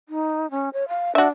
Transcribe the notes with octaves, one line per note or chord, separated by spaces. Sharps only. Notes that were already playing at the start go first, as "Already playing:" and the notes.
D#4
C#4
C#5
F5
D4 F#4 E5